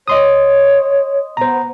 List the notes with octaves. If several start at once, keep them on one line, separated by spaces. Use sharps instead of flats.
C#5 D#5 C6 D#6
B3 C5 A#5